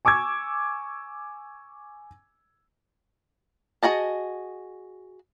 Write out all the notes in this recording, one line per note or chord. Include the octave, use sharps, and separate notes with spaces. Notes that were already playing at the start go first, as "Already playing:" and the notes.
G#5 C#6 D6 E6 G#6
F#4 G#4 D#5 A5